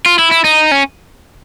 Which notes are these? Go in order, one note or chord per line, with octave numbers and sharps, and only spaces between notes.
F4
E4
E4
D#4
C#4